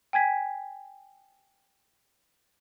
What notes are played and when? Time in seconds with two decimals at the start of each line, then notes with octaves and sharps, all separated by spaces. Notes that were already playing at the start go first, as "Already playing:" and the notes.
0.13 G5 G#5 G#6 B6